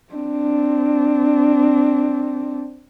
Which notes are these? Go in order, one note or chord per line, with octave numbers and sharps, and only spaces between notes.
C4 D4